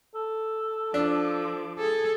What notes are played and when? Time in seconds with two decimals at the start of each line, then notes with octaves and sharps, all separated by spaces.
0.15 A4
0.94 F3 D4 D6
1.78 G#4 A4